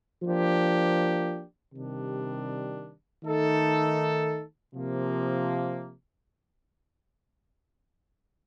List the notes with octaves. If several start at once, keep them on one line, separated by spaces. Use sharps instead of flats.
F3 A#3 D4 G4
C3 D#3 G3 D4
D#3 A3 D#4 A4
C3 F3 A#3